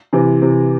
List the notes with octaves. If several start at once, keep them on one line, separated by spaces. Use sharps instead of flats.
C3 E3
C3